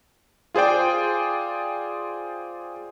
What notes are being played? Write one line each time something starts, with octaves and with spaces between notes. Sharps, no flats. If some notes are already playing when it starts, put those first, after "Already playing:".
F4 G#4 C5 D5 G5